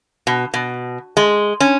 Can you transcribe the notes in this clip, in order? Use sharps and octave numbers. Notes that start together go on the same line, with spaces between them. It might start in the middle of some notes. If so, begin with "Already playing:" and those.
B2
B2
G#3
C#4